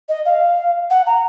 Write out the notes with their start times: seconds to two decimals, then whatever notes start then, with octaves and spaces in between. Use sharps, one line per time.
0.09 D#5
0.25 F5
0.90 F#5
1.06 A#5